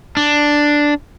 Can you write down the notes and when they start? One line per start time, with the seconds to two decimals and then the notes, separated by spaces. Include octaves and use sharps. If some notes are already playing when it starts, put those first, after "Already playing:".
0.17 D4